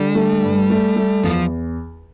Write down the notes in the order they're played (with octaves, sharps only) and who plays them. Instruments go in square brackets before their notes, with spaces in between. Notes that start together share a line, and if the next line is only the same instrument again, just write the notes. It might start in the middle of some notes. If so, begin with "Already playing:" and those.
Already playing: [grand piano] D3 [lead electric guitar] G3
[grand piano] A3
G2
A3
A3
[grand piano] E2 [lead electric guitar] F3